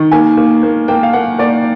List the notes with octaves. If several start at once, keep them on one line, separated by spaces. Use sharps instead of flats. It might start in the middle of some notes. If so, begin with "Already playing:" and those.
Already playing: D#3
A#3 G#5
A#3
A#3
A#3 G5
F5
A#3 F#5
A#3 D5